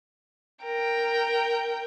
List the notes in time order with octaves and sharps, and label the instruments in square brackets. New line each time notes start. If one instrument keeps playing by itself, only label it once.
[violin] A#4 G5